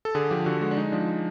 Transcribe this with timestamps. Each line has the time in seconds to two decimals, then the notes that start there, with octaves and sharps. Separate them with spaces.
0.05 A4
0.15 D3 G#4
0.31 F3 G4
0.46 D3 F#4
0.61 G#3 F#4
0.71 D4
0.77 G#3 D#4
0.92 F3 D4